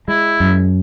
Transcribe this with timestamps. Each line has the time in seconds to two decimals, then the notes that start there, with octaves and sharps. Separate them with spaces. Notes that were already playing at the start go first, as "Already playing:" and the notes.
0.08 G#3 E4
0.40 F#2